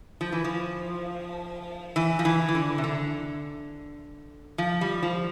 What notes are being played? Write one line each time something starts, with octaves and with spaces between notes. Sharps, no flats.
F3
E3
F3
E3
F3
E3
E3
D3
C3
D3
F3
G3
F3